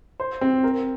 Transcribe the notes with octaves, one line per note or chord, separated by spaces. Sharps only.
C5
C4
A#4